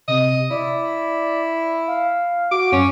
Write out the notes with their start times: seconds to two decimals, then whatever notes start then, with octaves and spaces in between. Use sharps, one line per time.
0.08 C3 D#5
0.50 E4 D5
1.88 F5
2.51 F#4 D6
2.72 F#2 C#4